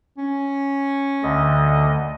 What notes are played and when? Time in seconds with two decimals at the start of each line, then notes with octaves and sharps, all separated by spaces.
0.18 C#4
1.23 D2 D3 D#5